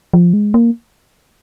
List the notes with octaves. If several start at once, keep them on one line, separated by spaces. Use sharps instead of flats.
F3
G#3
A#3